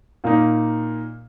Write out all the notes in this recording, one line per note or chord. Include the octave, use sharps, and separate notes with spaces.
A#2 A#3 D#4